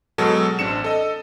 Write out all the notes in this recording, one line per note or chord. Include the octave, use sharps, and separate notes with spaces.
B2 F#3 G#3 A4
A1 C4 D4 C#7 E7
A4 D#5